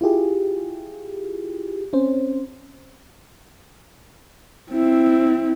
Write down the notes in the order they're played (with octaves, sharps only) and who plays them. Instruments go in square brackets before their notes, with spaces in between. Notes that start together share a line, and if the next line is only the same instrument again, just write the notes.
[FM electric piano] E4 F4 G4 G#4
C4 C#4 C5
[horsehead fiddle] C4 E4